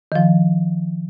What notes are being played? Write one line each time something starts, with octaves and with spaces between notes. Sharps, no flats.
D#3 F3